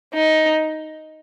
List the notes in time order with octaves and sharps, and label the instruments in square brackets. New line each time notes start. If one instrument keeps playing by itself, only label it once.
[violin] D#4